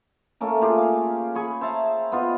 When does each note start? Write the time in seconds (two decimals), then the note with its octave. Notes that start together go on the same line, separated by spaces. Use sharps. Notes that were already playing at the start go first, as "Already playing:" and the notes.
0.41 A3 A#3 C#4
0.61 F4 G4 G#4
0.77 F5
1.35 G#4 B5 C#6
1.61 C5 E5 A5 A#5
2.12 B3 F4 D#5